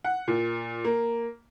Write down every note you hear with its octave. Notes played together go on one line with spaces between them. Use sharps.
F#5
A#2
A#3